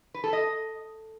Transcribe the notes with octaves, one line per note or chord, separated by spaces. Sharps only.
B4
A4
D#5